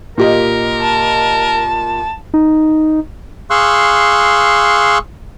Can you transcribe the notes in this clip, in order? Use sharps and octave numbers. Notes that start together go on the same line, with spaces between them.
A#2 G4 A#4 D#5
A5
D#4
G#4 F5 C6 C#6 E6 F#6